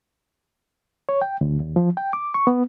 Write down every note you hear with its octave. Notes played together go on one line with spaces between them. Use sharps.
C#5
G5
D2
D#2
F3
G5
D6
C#6
B3